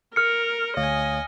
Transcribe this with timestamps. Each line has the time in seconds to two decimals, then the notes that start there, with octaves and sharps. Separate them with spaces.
0.16 A#4 F6 C#7
0.77 D2 C#5 D#5 F5 G#5